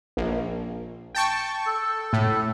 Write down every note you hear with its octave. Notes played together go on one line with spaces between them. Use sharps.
A#1
G5 A5 C#6
A4
A2